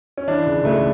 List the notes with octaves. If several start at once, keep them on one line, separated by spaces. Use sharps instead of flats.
C#4
E3 D4
C#2
C#2 A3